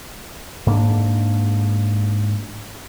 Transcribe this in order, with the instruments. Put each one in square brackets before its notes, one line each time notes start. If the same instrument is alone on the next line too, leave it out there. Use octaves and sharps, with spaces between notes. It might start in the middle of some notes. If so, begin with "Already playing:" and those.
[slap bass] G#2 A#3 D4